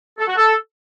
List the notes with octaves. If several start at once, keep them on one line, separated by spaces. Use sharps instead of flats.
A4
F#4
A4